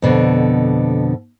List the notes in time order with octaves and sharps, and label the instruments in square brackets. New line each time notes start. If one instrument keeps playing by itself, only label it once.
[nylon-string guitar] F2 B2 D3